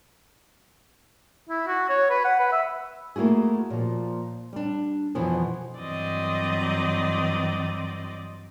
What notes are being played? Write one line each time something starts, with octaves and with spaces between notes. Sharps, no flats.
E4
F#4
C#5
B4
F#5
B4
E5
A3 A#3 E4 F#4 G#4
A#2 F3
G3 D4
F2 B2 E3 F3 B3
G2 E3 F#3 C4 D5 D#5